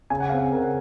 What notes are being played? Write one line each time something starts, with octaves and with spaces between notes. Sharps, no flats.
C#3 G#5
F#5
C4 F5
F#5
C#3 A#4